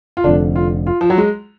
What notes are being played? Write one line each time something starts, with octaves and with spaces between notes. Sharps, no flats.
F4
F1 F2 D3 D4
F4
F4
F3
F#3
G#3